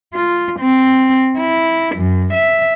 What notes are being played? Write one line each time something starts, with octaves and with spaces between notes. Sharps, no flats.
F4
C4
E4
F#2
E5